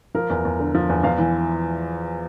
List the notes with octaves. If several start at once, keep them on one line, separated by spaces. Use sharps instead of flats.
F3 A#4
E2
E2
D3
F3
E2
E2 F5
E3